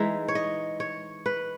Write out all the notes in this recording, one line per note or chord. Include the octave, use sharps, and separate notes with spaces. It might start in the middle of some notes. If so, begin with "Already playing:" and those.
Already playing: E3 G#3 D#4 E5
C#5
D#5
C#5
B4